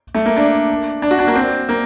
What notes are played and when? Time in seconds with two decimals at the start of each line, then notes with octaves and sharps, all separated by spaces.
0.15 A3
0.26 A#3
0.37 D4
1.02 D4
1.11 F#4
1.19 D4
1.27 A#3
1.36 C4
1.69 A#3